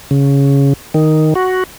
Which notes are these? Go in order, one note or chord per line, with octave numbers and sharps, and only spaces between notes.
C#3
D#3
F#4